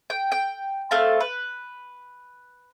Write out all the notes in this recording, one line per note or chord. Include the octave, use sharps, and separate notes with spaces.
G5
G5
A3 C4 F5 A5
B4